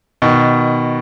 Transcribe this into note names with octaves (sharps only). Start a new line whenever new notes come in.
B2 D#3